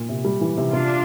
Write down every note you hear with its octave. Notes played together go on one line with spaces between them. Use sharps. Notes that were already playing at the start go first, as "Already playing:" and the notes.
Already playing: A#2
C3
G3
E3
C3
C3 D4 F4